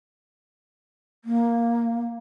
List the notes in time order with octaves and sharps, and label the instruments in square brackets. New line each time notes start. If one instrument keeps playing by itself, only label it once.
[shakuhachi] A#3